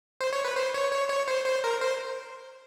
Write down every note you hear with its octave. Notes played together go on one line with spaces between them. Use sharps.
C5
C#5
B4
C5
C#5
C#5
C#5
C5
C5
A#4
C5